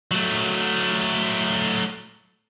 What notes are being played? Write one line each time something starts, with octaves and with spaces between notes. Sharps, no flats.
F#3 A3